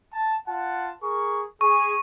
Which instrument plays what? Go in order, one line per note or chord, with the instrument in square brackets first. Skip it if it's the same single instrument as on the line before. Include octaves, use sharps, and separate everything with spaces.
[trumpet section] A5
F4 F#5 A5
G#4 A#4 C#6
[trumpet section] G#4 [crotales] C#6